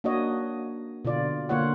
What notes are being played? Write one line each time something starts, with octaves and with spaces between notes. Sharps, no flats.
A#3 D4 F#4 C#5 D#5
B2 D3 F4 D5
D3 A#3 F4 C#5 F#5